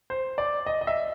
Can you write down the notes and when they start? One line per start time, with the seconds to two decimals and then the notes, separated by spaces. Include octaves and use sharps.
0.10 C5
0.38 D5
0.66 D#5
0.81 D#5
0.87 E5